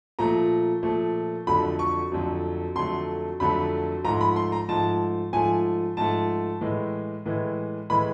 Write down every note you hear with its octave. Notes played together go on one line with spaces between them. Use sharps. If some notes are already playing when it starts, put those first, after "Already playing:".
A#2 F3 A3 A#5
A#2 F3 A3
F2 D3 F#3 A3 B5
C#6
F2 D3 F#3 A3
F2 D3 F#3 A3 C6
F2 D3 F#3 A3 B5
G#2 F3 A3 A#5
B5
C6
A#5
G#2 F3 A3 A5
G#2 F3 A3 G#5
G#2 F3 A3 A5
A2 E3 G#3
A2 E3 G#3
A2 E3 G#3 B5